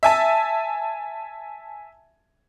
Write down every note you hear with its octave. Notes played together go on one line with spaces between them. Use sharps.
E5 G#5 A5